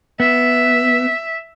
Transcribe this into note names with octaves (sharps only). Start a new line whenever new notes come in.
B3 E5